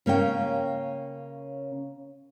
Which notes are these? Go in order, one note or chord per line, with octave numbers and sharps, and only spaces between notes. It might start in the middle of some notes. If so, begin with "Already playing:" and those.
C#3 A#3 C#4 G5